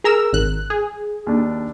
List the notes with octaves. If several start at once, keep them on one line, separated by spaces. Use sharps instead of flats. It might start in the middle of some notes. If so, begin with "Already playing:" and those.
G#4 A#4 E6
G#1 F#6
G#4
D#2 D4